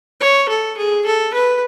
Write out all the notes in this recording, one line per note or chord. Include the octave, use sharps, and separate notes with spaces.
C#5
A4
G#4
A4
B4